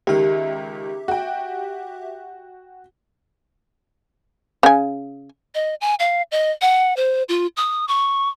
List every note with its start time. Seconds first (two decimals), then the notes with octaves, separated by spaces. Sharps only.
0.07 C#2 D#3 G4 E5
1.08 F#4 G5
4.63 C#3 G#5
5.55 D#5
5.81 G#5
5.99 F5
6.31 D#5
6.61 F#5
6.97 C5
7.29 F4
7.57 D#6
7.88 C#6